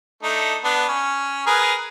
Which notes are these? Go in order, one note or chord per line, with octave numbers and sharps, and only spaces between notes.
A3 D4 D#4
B3 D4
C#4
G#4 A#4 B4